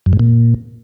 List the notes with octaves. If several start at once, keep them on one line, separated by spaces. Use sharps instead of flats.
F#2
G#2
A#2